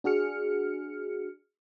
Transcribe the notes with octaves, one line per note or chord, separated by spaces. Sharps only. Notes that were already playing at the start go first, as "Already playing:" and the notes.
D4 F#4 G#4 F6 C#7